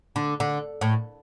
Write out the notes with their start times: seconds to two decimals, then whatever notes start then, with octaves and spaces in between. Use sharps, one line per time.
0.16 D3
0.40 D3
0.81 A2